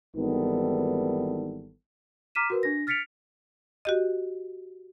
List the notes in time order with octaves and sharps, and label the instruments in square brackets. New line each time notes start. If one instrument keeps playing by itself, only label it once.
[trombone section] G#1 D#3 E3 G3 B3 A4
[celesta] A#5 D6 F6 B6 D#7 E7
F#4 A#4 B4
D4 A#6
F6 A6 B6 C#7 D7 F7
[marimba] F#4 G4 D#5